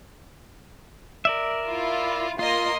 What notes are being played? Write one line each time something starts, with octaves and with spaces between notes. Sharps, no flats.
A#4 D5 E5
E4 F4
A#3 F4 D#5 C6